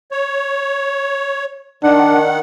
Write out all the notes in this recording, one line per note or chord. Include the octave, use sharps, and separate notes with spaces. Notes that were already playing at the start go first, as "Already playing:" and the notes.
C#5
D#3 D4 F#5